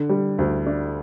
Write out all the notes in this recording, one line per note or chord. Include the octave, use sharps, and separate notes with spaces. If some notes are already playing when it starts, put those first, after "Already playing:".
Already playing: D3
G3
D2
D4